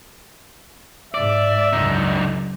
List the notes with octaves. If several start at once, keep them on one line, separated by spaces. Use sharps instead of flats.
G#2 D5 E5
C#2 F#2 D3 D#4